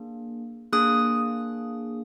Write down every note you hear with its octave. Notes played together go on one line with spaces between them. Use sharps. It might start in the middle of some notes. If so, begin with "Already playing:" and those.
Already playing: A#3 D4 G#4
A#3 D4 G#4 D#6 F#6